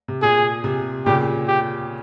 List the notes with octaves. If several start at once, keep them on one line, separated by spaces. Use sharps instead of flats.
C3
A#2 G#4
C3
A#2 C#3 G4
G4